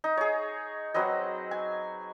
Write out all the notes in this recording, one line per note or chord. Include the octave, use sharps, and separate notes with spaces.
D#4
G#4 C#5
F#3 C4 B4 D#5
G#5